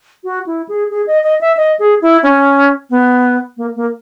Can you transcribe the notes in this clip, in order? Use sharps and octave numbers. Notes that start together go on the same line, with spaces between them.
F#4
E4
G#4
G#4
D#5
D#5
E5
D#5
G#4
E4
C#4
B3
A#3
A#3